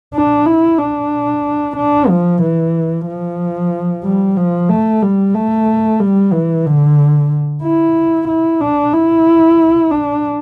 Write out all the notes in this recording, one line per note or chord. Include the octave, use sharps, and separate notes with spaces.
D4
E4
D4
D4
F3
E3
F3
G3
F3
A3
G3
A3
G3
E3
D3
E4
E4
D4
E4
D4